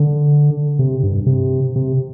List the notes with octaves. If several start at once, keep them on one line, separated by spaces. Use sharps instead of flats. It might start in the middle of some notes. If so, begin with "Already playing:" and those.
Already playing: D3
C3
G2
C3
C3